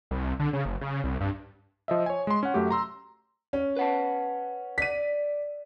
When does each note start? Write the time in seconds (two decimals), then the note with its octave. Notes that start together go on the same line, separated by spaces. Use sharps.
0.11 C2
0.40 D3
0.53 C#3
0.65 F#1
0.81 C#3
1.04 C2
1.21 G2
1.88 F3 D#5 E5
2.06 C#5 G#5
2.27 G#3 C6
2.43 C#4 F#5
2.54 F#2 A3 F#4 G4
2.70 A#5 C6 E6
3.53 C#4
3.77 B4 F#5 A5
4.78 D5 B6 D#7